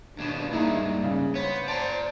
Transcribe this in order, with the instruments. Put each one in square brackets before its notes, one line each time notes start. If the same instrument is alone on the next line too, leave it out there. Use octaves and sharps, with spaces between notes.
[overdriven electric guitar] D#2 B2 [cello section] D4
[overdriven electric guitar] G2 G#3 [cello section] A#3 [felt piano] D#4 E4
[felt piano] C#3
[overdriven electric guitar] B3 [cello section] C5 [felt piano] C#5
[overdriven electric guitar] D5 A#5 [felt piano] A5